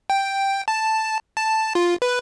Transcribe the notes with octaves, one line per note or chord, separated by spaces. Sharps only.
G5
A5
A5
F4
B4